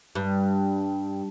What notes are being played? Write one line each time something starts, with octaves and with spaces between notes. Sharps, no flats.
G2